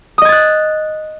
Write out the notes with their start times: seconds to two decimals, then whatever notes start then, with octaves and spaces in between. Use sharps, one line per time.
0.18 D#6
0.22 D#5
0.25 G#6
0.29 A6
0.32 F#6